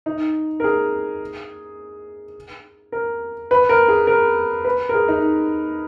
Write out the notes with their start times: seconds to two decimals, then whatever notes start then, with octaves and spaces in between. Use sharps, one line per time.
0.06 D#4
0.60 A#4
0.64 G#4
2.92 A#4
3.51 B4
3.69 A#4
3.88 G#4
4.07 A#4
4.65 B4
4.89 A#4
4.94 G#4
5.08 D#4